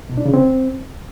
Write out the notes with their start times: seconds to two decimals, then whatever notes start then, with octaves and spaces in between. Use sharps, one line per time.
0.09 B2
0.18 D4
0.26 C#3
0.34 C4